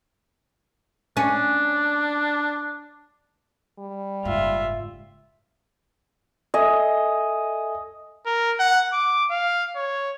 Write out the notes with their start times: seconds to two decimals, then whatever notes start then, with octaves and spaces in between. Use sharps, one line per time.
1.17 C#4 D4
3.79 G3
4.25 F#1 G#2 F4 E5
6.54 A4 D#5 E5 G#5
8.26 A#4
8.59 F#5
8.93 D6
9.30 F5
9.76 C#5